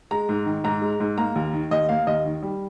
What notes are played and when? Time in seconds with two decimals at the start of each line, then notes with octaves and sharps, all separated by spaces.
0.11 G#3 A#5
0.29 G#2
0.46 D#3
0.64 G#2 A#5
0.82 G#3
1.00 G#2
1.18 A#3 A#5
1.36 D#2
1.53 D#3
1.71 D#2 D#5
1.89 A#3 F5
2.07 D#2 D#5
2.25 D#3
2.42 G3